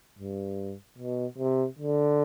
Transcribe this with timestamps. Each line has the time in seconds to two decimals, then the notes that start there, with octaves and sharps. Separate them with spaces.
0.19 G2
0.98 B2
1.38 C3
1.79 D3